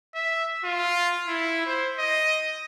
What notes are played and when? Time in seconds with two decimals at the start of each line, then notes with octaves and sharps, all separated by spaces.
0.15 E5
0.64 F4
1.27 E4
1.66 C5
1.99 D#5